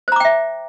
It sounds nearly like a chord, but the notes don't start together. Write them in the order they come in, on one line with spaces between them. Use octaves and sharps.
C5 A#5 D6 G5 E5